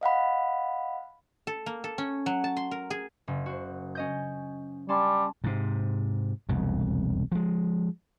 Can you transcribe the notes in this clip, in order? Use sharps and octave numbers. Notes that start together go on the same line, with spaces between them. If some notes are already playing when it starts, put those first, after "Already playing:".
D#5 F5 F#5 B5
A4
A#3
A4
C#4
F#3
A5
C6
A#4
G#4
F#1
F#4 C5
C#4 D#5 G6
G3 C#4 A5 C6
G#2 C3
E1 C2 F2
F3 G#3